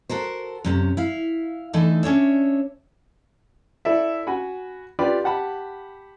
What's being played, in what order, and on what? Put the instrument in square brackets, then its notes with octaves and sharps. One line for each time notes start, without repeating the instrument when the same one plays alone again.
[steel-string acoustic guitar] F#4 A4 A#4 C5
F#2 C3 C#4
E4 F5
D3 E3 A3 D#4 A4
C#4 D4 C#5 E5
[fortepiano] E4 A4 D5 E5
F#4 G#5 B5
F4 G4 B4 D5 B5
G4 F#5 A5 B5